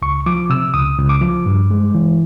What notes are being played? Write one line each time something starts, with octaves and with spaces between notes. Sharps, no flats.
C#2 C#6
F3 D6
C3 E6
C#2 D#6
C#2
D6
F3
G2
G#3
E3